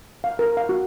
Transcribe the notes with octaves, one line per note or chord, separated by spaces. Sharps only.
F5
A#4
F5
F#4